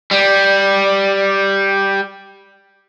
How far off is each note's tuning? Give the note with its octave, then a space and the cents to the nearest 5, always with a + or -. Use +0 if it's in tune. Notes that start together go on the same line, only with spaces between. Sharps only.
G3 +0